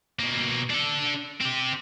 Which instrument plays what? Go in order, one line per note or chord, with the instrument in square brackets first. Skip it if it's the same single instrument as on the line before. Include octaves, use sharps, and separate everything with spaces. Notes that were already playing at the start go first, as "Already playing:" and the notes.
[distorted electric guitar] B2 A#3
D4 A4
C4 G4